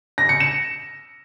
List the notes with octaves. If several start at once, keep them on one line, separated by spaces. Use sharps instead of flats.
A#6
C#7
E7